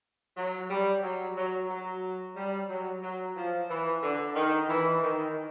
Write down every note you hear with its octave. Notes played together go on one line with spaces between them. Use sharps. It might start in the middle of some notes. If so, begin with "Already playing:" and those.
F#3
G3
F#3
F#3
F#3
G3
F#3
F#3
F3
E3
D3
D#3
E3
D#3